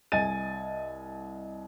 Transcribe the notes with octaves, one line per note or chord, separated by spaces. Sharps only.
C2 D#5 G#5 A6 D#7